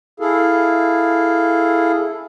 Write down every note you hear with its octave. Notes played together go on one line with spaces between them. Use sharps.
E4 G#4 A4 F5